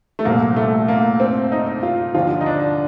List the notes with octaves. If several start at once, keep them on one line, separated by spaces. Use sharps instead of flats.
A3
C2 A#2 F3 A#3
A3
A#3
C4
D#4
F4
D#2 D3 F3 F4
D#4
D4